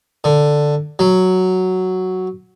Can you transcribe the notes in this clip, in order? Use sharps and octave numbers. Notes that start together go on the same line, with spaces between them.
D3
F#3